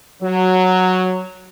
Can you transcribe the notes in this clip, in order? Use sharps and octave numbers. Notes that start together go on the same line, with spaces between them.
F#3